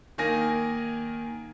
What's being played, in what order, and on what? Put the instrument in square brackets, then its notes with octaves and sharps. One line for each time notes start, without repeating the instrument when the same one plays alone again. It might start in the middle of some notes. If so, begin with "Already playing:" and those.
[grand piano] D#3 A#3 G#5 A#6